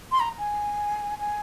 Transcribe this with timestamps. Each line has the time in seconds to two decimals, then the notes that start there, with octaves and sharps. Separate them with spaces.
0.12 C6
0.20 A#5
0.38 G#5
1.19 G#5